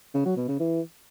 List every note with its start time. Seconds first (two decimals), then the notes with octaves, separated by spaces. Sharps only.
0.14 C#3
0.25 F#3
0.37 B2
0.48 C#3
0.59 E3